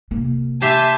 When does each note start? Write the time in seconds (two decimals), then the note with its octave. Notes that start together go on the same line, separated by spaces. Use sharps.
0.11 C3 A#3
0.62 G4 E5 G#5 A5 C6